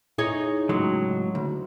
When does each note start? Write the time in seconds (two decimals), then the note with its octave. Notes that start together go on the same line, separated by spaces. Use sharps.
0.18 D#4 E4 G#4 C#5
0.69 C#2 A2 F#3 G#3
1.35 D2